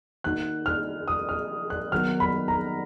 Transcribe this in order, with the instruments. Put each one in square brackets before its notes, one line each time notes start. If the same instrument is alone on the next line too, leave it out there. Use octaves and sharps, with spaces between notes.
[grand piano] D#3 A#3 D#4 F#4 [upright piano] F#6
[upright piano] F6
D#6
F6
F#6
[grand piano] D#3 F#3 B3 D#4 F#4 [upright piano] F6
[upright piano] B5
A#5